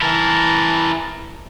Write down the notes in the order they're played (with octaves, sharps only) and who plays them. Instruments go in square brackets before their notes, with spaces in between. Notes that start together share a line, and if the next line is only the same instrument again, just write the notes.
[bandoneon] E3 A5 [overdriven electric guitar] E4 A#4